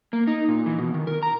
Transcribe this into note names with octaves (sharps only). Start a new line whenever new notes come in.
A#3
D#4
A#2
E3
B2
D#3
A#4
A#5